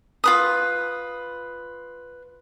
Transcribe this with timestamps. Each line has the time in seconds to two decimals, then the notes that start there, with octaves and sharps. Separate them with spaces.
0.24 F4 B4 D#6